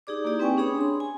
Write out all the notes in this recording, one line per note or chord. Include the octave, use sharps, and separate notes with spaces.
D#4 G4 G#4 D5 D6
A#3 D#4 E4 G4 D5
C4 B4 G5 G#5 C#6
C#4 D4 G#4 C#5 B5 D#6
G#4 C6
G#5